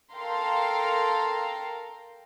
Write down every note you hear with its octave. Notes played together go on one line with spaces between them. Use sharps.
A4 A#4 F5 G5 A#5 C6